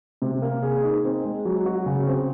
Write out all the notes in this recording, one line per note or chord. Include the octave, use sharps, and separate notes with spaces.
C3
A#3
G#4
D#4
C4
G#3
F#3
F#4
C#3
C4